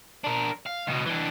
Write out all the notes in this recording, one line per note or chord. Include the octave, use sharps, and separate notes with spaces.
D4 A#4
F5
C#2 B2
E3 D4